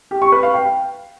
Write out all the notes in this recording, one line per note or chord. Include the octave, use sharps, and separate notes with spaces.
G4
C#6
B4
F5
G5